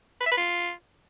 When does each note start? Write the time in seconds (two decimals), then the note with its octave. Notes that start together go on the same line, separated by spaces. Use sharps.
0.21 B4
0.26 E5
0.32 B4
0.37 F4